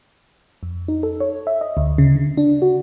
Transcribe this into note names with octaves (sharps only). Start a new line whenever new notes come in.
F2
D#4
A4
C#5
E5
D#5
D2
C#3
D3
D4
F#4